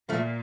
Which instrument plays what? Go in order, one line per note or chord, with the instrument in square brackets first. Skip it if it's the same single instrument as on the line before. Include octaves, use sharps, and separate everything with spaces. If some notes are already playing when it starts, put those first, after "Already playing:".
[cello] A#2 [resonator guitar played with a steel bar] F3 A3